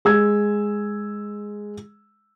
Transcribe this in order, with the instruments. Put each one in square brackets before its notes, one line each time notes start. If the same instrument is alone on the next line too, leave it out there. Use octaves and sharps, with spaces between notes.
[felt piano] G#3 E6 G#6